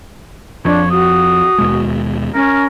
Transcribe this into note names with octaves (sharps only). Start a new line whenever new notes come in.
F2 F3 D4 C#5
F#4 D#6
D#2 B2 G#3
C#4 A#4